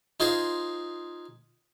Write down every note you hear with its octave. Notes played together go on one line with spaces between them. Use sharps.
D#4 F4 G#4 C5